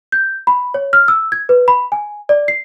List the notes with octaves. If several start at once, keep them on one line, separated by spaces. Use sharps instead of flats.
G6
B5
C#5
F6
E6
G#6
B4
B5
G#5
D5
C7